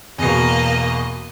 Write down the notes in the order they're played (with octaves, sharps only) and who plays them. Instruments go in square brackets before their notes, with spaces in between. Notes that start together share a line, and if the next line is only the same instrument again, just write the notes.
[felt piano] E2 B2 [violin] A#3 D#5